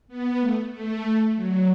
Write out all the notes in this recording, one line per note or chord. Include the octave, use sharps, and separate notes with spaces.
B3
A3
A3
A3
F#3